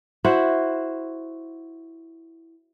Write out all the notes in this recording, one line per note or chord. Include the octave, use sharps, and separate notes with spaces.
E4 F#4 C5 F#5